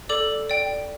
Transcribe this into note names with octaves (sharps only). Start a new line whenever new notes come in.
A4 D5 D6
D5 G5